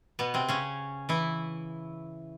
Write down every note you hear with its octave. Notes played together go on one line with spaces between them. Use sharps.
B2 B3
C3 C4
C#3 C#4
E3 E4